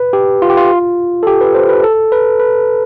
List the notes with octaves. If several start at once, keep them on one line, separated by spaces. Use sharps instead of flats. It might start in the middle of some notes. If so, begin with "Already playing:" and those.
Already playing: B4
G4
F4
G4
F4
A4
G4
B4
C5
B4
A4
B4
B4